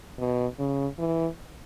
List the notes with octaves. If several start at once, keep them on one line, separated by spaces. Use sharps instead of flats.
B2
C#3
E3